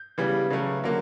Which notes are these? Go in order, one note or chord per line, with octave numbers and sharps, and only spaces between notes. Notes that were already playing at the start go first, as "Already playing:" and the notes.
Already playing: G6
C#3 E3 G3 B3
C#3 F#3 A3
D3 F#3 A#3